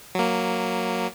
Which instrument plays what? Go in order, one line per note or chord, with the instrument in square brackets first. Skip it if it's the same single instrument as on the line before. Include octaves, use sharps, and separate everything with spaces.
[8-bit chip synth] F#3 A#3